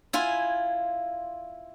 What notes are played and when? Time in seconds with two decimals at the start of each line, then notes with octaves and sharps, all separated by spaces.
0.13 E4 F4 G#5